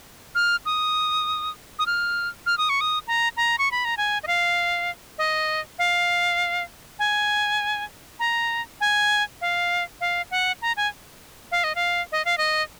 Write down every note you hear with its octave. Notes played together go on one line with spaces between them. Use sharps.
F6
D#6
D#6
F6
F6
D#6
C#6
D#6
A#5
A#5
C#6
B5
A#5
G#5
D#5
F5
D#5
F5
G#5
A#5
G#5
F5
F5
F#5
A#5
G#5
F5
D#5
F5
D#5
F5
D#5